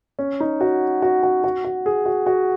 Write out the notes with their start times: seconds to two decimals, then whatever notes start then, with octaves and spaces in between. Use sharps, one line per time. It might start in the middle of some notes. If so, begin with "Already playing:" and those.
0.19 C#4
0.40 D#4
0.61 F#4
1.02 F#4
1.23 F#4
1.44 F#4
1.64 F#4
1.86 G#4
2.06 F#4
2.26 F#4